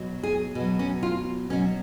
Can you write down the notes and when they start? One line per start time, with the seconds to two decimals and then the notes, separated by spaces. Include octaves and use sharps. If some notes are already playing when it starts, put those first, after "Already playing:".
Already playing: B2 F#3
0.23 G#4
0.55 B2
0.60 F#3
0.79 C#4
1.03 F4
1.50 B2 F#3 C#4